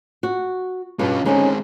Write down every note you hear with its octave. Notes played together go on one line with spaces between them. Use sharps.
F#4
G2 B2 C#4 F4
D3 G#3 C4 C#4 D#4